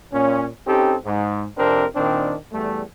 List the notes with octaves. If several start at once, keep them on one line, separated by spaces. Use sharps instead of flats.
A#2 C#4
C4 C#4 D#4 G4 A4
G#2
F2 C3 C4 D4 A#4
A#2 D#3 C4 D4
E2 G3 A3